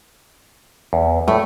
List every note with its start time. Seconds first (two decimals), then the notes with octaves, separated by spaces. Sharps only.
0.93 E2
1.28 A2 A3